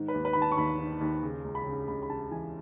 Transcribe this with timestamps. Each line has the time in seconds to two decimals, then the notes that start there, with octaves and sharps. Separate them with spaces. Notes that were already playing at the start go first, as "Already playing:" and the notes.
Already playing: G#2 D#3
0.08 B4
0.14 D#2
0.25 B4
0.33 D#3 B5
0.42 A5
0.52 C#6
0.57 D#2 B5
0.79 D#3
1.01 D#2
1.23 C#3
1.44 C#2
1.55 B5
1.66 C#3
1.88 C#2 B5
2.03 B5
2.09 C#3 A5
2.31 E3 G#5